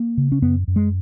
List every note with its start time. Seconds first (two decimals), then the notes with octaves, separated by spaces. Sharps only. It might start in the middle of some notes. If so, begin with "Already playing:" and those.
Already playing: A#3
0.17 C#3
0.32 C#4
0.42 F#2 B3
0.68 F#2
0.76 G#3